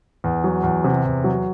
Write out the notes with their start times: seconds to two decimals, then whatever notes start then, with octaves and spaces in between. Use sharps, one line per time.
0.24 E2
0.44 F#3
0.63 E2
0.84 C3
1.04 E2
1.24 F#3